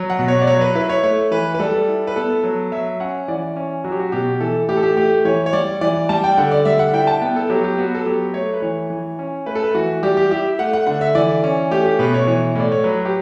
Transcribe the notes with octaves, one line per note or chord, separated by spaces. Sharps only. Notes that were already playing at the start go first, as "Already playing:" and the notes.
Already playing: F#3
F#5
B2
C#5
D5
F#3 C#5
B4
E4 B4
C#5
A3 C#5
E3 B4
B4
G3 A4
E4
B4
B3 A4
F#3
F#3 E5
C#4 F#5
E3 D5
C#4
F#3 F#4
G4
F#4
B2 G4
E3 A4
A2 G4
A4
G4
A3 G4
E3 C#5
C#5
G3 D5
E3 D5
G3 A5
G5
D3 F#5
D5
G3 E5
F#5
E4 G5
A5
B3 G5
A4
F#3 G4
G4
B3 F#4
A4
F#3 G4
A3 C#5
B4
E3 C#5
E3
C#4
A3 B4
A4
B4
E3 F#4
G3 G4
G4
E4 G4
A3 F#5
F#5
D3 F#5
E5
E3 D5
C#4
A3 G4
G4
B2 B4
C#5
E3 C#5
A2 D5
C#5
F#3 B4
G4